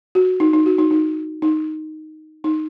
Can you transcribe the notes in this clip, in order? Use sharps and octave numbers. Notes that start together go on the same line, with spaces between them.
F#4
D#4
D#4
F#4
D#4
D#4
D#4
D#4